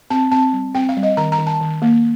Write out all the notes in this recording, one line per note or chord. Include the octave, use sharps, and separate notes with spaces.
C4 A5
C4 A5
G3
C4 G5
F5
G3
D#5
D#3 A#5
A#5
D#3
A5
D#3
A#3